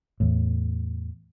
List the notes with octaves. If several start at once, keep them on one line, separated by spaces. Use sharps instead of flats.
E2 A2